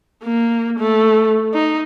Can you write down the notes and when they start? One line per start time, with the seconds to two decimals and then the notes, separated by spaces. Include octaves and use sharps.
0.23 A#3
0.79 A3
1.53 D#4